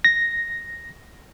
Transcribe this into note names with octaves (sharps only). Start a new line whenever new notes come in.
A#6